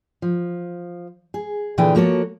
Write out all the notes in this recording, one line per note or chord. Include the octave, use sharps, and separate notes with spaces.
F3
G#4
A#2 D3 E3 G#4 B4 G5
F3 A#3 F#4 A4 C#5